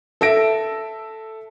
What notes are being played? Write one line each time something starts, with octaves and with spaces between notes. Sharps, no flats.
A4 E5 A#6 D7